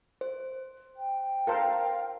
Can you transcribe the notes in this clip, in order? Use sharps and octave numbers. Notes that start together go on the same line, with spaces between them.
C5
G5
A4 A#4 C5 F5